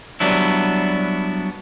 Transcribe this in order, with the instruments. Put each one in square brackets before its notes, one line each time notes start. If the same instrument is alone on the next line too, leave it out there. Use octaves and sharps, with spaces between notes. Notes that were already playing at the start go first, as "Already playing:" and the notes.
[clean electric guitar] F#3 G3 B3 D4 E4